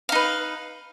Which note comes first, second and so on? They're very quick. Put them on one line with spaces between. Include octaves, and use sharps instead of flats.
F5 D#4 B4